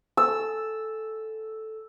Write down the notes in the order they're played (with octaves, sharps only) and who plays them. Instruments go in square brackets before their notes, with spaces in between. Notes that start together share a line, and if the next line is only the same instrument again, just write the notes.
[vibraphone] A4 [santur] E6